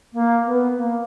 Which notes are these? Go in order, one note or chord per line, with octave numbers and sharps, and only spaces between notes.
A#3
B3
A#3